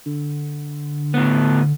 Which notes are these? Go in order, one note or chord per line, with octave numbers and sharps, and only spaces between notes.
D3
A2 B3